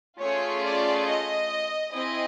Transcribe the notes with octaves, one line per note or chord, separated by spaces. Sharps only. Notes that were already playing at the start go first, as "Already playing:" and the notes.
A3 C#4 F4 G#4 C#5
D5
D#5
C4 E4 G#4 D#5